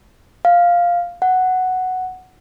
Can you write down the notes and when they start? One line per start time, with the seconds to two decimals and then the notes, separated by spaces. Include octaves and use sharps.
0.45 F5
1.22 F#5